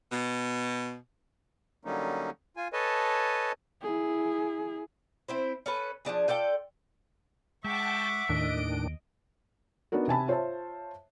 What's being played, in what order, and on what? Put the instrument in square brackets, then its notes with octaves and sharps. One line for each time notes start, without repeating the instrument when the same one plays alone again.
[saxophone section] B2
[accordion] D3 F#3 G3 A#3 C#4 D#4
F4 G#5
A4 B4 C#5 D#5 G#5 A5
[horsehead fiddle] E4 G#4
[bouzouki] C4 E4 C5
C#4 A4 B4
F3 G3 D4 G#4
F4 A4 D5 G5
[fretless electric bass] G#3 [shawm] E5 [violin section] F#5 C#6 D6 [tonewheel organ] G5 A5
[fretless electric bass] D#2 [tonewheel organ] A2 D#3 D4 [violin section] D#5 D7
[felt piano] B3 D4 D#4 F#4 A#4
C3 G#5 A5 B5
F4 C5 C#5 E5 A5